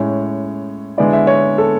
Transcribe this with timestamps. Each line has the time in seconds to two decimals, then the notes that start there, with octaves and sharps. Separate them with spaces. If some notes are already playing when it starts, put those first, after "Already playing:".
Already playing: A2 G#3 C#4 C#5
0.98 D3 G#3 B3 E4 D5
1.13 E5
1.27 C#5
1.58 A4